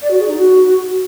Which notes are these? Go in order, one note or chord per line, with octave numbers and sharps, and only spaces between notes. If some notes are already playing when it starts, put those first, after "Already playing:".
D5
F#4
G#4
D#4
F#4